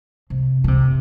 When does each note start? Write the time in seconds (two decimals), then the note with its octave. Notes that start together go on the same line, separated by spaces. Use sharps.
0.30 C3
0.64 D3
0.68 C3